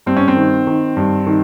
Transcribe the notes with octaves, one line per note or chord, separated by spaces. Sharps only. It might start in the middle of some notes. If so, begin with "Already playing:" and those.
G2 C4
C#4
C4
D#3
D#3
G2
D#3